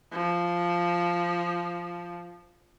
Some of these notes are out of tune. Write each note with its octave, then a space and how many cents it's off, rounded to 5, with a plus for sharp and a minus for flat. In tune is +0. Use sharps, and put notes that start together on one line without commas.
F3 -5